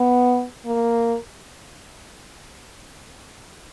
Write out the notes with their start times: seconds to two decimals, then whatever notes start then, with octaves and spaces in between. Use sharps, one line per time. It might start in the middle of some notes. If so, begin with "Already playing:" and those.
Already playing: B3
0.66 A#3